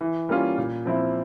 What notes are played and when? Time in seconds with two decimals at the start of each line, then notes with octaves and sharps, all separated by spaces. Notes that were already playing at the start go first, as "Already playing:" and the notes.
0.01 E3
0.29 G3 A#3 C#4 F4
0.57 A#2
0.85 F3 C4 E4